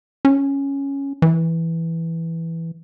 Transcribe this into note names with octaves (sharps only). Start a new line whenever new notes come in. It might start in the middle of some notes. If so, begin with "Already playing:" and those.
C#4
E3